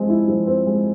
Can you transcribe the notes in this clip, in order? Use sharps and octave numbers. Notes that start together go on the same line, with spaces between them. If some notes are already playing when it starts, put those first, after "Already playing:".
Already playing: F3 G#3 C4
E4
F3
C4
G#3